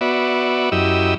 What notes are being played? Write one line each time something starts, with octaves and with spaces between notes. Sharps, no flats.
B3 F#4 D5 E5
F#2 E4 G4 D#5 E6